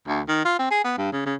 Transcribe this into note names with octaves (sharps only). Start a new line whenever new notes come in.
D2
D#3
F4
C4
G#4
B3
G2
C#3
C#3